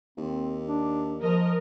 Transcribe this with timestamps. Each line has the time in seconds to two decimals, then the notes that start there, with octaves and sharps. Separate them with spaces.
0.18 D#2 C4
0.65 D4
1.21 F3 A#4 D#5